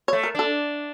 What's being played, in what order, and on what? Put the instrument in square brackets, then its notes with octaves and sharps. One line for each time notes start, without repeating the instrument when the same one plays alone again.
[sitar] A3 [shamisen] C#5
[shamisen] A#4
[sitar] D4 [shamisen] A4